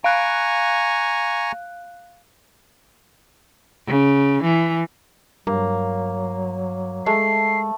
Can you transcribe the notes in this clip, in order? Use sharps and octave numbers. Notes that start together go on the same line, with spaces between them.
F5 G#5 A#5 C#6 F#6
C#3
E3
G2 F#3 A#3
G#3 A3 C7